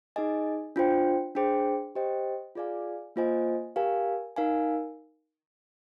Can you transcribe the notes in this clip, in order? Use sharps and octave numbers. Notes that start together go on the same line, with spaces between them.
D#4 G#4 D#5 G#5
D4 F4 C5 G5
D4 G#4 C5 G5
G4 C5 D#5 G5
F4 G#4 D5 F5 G#5
A#3 F4 C5 D#5 G#5
G4 A#4 F5 G#5
D#4 A#4 F5 G#5